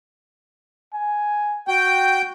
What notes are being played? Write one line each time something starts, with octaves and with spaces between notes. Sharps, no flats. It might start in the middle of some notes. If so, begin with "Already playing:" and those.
G#5
F#4 G5